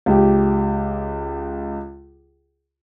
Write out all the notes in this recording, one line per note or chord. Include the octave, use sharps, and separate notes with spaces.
C#2 G4